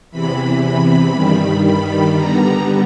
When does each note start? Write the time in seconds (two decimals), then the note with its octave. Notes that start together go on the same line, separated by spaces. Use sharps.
0.11 E2 C3 E3 B5
0.63 B5
1.14 G2 D#3 G3
1.65 B5
2.16 D3 G3 B3 A#5